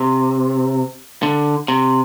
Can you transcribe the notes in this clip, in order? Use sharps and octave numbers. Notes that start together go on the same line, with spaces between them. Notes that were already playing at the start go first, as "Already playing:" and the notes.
Already playing: C3
D3
C3